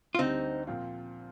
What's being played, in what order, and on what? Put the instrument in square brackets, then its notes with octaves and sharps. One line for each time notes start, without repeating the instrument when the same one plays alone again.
[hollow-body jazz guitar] F4
[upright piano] D2 D3 G3 [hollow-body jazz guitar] C4 D#4
[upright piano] A#2 F3 C4 F4